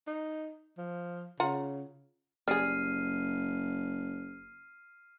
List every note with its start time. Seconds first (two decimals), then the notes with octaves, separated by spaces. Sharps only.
0.07 D#4
0.77 F3
1.40 C#3 F4 F#5 A#5
2.48 F#1 G3 G#4 F6 C7 D#7